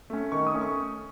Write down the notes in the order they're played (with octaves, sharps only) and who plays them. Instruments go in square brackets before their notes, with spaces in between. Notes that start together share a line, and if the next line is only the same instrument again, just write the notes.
[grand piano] A3 C#4
D#3 C#6
D#6
A3 C#4
C#6